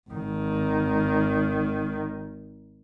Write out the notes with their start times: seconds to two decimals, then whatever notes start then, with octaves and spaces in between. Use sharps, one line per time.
0.10 G#1 D#3